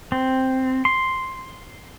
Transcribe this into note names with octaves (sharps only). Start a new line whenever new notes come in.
C4
C6